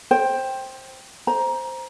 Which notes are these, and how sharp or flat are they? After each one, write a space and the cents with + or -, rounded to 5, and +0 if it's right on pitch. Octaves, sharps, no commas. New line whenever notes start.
C5 +15 G5 +0
C5 +0 A#5 +15